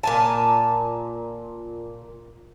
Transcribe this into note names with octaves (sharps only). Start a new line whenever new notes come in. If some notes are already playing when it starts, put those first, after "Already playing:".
A#2 G#5 A5